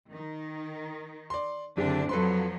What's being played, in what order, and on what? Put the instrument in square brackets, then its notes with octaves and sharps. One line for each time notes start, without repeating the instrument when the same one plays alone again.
[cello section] D#3
[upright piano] D5 C6
[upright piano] F#1 G4 [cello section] D3 C4 D4
[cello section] F2 F3 F#3 [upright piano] A4 B4 C6